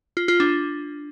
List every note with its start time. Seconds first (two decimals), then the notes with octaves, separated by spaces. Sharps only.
0.17 F4
0.28 F4
0.40 D4